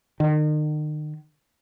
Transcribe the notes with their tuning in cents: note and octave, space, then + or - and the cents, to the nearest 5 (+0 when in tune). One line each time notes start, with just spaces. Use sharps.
D#3 -40